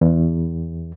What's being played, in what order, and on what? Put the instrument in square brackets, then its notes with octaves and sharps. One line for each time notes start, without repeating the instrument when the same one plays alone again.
[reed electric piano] E2